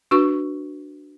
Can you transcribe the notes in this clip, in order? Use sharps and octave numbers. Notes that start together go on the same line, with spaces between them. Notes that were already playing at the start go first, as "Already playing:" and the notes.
D4 F#4 B4 C#6